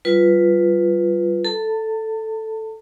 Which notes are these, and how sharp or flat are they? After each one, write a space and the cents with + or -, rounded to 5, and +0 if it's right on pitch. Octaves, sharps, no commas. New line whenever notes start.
G3 -30 F4 +0 B4 +0
A4 +0 A5 +40